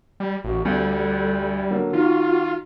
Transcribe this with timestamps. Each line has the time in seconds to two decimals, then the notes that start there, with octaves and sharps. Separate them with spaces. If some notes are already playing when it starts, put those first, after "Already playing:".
0.20 G3
0.44 A1 F#4
0.65 D2 G3 A4
1.70 D3 F#3 A#3
1.93 D#3 F4 F#4